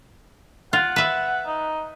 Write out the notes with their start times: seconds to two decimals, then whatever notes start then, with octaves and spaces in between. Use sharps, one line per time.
0.73 F4 F#5
0.96 B4 E5
1.46 D#4